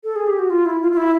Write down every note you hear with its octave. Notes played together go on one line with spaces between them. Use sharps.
A4
G#4
G4
F#4
F4
E4
F4
F4
E4